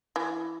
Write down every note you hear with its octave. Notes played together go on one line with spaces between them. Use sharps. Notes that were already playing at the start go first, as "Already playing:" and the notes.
E3